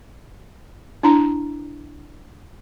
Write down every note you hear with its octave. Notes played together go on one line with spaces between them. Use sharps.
D4 E4 A#5